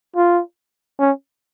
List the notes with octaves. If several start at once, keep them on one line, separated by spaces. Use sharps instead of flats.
F4
C#4